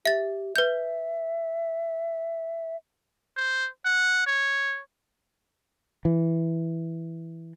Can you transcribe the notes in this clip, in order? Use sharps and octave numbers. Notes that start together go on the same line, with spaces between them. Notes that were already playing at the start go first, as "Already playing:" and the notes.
G4 E5 A6
B4 E5 G6
C5
F#5
C#5
E3